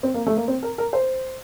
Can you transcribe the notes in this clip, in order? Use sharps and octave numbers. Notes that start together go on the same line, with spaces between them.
C4
A#3
A3
A#3
C4
A#4
A#4
C5